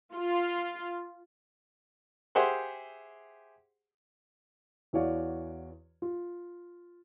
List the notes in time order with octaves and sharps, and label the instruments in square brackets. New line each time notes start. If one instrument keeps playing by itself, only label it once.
[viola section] F4
[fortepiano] G4 G#4 C5 E5 F#5 C6
[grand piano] E2 E3 F#4 C#5 D5 F5
F4